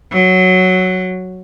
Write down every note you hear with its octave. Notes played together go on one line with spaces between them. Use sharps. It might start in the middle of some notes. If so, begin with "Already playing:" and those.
F#3